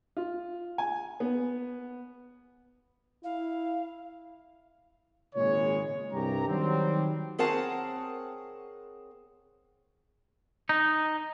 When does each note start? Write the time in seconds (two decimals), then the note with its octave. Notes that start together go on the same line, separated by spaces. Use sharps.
0.17 F4
0.78 G#5
1.20 B3
3.24 E4 F5
5.35 G#1 A#2 C#3 G#3 C#5
6.12 C2 G2 G4 A#5
6.49 D#3 F#3 G3 C4
7.39 C4 G#4 A#4 C#5 F#5 A5
10.69 D#4